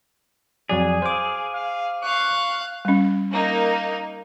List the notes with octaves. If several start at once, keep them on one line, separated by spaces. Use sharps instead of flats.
F2 F#3 G#4 D5
C5 F5 D6
F5
F5 C#6 F#6
G3 C#4
A#3 D#4